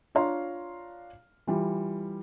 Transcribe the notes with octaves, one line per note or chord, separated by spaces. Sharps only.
D4 F4 C#5 F5 A#5 C6
E3 G3 F4